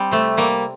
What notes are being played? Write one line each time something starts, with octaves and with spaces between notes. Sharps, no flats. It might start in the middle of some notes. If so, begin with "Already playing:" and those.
Already playing: G3 C4
C3 A3
G3 A#3